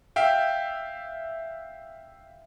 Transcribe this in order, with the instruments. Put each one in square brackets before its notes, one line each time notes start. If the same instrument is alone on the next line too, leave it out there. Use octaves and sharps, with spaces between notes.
[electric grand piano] E5 F5 G5